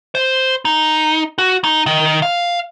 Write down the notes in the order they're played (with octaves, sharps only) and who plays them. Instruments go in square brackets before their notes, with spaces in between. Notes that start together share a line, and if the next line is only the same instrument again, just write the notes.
[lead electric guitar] C5
D#4
F#4
D#4
D#3
F5